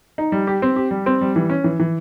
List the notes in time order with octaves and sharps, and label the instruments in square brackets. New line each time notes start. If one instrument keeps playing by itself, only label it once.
[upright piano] D#4
G3
G4
C4
G4
G3
C4
G3
E3
C#4
E3
E3